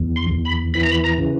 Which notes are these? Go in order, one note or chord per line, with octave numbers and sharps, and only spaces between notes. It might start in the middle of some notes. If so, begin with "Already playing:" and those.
Already playing: E2
C6
E2
B5
E3 B5
A#5
B5
A#5
C#3